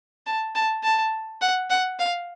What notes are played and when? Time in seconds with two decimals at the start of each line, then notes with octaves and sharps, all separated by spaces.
0.26 A5
0.55 A5
0.83 A5
1.41 F#5
1.70 F#5
1.99 F5